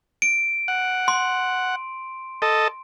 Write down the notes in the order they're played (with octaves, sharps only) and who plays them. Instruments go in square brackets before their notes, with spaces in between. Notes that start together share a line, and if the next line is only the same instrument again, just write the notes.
[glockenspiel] D7
[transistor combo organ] F#5
[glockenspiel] C6
[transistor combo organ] A4 D#5